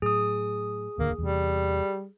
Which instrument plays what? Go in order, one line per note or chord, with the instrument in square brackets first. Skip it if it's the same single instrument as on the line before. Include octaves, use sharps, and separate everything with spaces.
[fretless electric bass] A2 F#3 [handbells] G#4 D#6
[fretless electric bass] D1 D#2 D3 [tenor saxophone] A#3
[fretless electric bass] E2 C3 [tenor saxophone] G3